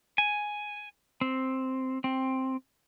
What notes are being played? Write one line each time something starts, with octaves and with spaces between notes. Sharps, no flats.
G#5
C4
C4